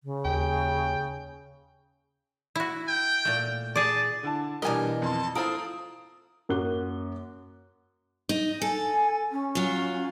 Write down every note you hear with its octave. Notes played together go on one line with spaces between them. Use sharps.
C#3
D#2 G5
E4 F#4
G5
A#2 A3
G#4 D5 A5
D3 E4 A5
B2 E3 G3 D4 A#4 D#5 G#5
F2 A5 C6
E4 F4 A4 C5 A#5 D#6 D7
F#2 A#3 F#4 D6 F#6 G7
D#4
A4 G#5
C#4
F#3 F4